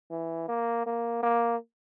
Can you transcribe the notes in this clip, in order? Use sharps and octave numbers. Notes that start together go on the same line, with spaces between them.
E3
A#3
A#3
A#3